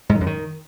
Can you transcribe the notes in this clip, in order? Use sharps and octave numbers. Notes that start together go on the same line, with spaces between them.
G#2
D#3
F#2
D#3